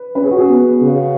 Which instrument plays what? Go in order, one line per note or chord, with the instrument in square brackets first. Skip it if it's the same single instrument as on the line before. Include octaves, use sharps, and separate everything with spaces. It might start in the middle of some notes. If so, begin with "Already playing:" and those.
Already playing: [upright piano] B4
[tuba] C#4 [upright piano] B4
[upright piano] G#4
F#4
G#4
[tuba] B3
C#3